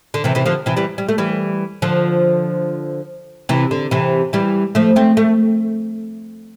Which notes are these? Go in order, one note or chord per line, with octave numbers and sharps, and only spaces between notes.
D3
C3 E3
C3 E3
D3 F3
C3 E3
E3 G3
G3
A3
E3 G3
D3 F3
C3 E3
D3
C3 E3
E3 G3
F3 A3
A3 C4
A3